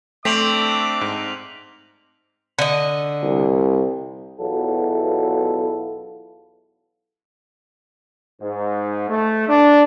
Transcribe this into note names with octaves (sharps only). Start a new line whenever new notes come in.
A3 C4 D4 E5 D6 B6 F7 F#7
G#2
D3 D#5
C2
B1 E2 F#3 E4 F4 A4
G#2
A3
D4